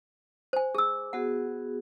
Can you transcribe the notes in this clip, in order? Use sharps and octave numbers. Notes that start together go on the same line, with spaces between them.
C5 G#5
G#4 D6 E6
B3 F#4 G#4 F#5